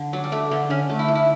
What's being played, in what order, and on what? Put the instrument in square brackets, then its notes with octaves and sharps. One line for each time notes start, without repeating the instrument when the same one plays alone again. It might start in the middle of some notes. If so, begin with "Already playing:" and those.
Already playing: [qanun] D3
[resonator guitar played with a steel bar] F#3 [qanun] D4
[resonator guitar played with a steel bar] G3
[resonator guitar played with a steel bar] A3 [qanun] D4
[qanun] D3 [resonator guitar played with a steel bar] B3
[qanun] D3 [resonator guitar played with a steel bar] C#4
[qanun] A3
[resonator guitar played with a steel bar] E4
[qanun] D4
[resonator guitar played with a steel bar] E4